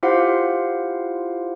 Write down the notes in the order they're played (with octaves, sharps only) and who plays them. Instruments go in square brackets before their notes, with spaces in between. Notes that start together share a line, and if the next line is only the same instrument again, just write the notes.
[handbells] E4 F4 G4 C5 F5 F#5